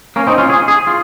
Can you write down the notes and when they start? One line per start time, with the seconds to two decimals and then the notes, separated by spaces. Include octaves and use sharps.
0.16 A#3 C#4
0.27 C4 D#4
0.38 C#4 F4
0.50 G#4
0.68 G#4
0.87 F4